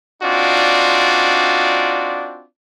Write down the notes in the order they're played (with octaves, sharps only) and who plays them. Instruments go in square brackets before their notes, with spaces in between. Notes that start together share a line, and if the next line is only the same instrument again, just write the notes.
[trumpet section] C4 D4 D#4 F4 F#4 D5